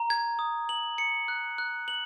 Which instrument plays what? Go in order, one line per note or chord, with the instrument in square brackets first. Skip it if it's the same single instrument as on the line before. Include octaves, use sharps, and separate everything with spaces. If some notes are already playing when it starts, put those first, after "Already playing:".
Already playing: [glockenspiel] A#5
G#6
D#6
F#7
C#7
F#6
F#6
F#7